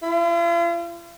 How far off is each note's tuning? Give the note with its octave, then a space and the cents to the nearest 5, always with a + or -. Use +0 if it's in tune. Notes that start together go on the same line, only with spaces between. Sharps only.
F4 -45